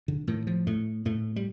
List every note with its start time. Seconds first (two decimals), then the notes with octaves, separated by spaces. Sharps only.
0.08 D3
0.27 A2 D#3
0.47 F3
0.67 A2 A3
1.05 A2 A3
1.36 G3